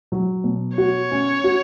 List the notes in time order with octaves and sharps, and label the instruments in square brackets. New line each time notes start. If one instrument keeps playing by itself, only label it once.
[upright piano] F#3
B2
[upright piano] F#4 [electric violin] C#5
[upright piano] C#4
F#4